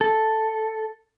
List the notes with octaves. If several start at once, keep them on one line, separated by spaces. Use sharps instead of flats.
A4